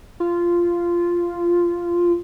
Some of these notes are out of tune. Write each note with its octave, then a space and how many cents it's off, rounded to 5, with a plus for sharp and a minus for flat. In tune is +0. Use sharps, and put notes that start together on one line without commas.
F4 -10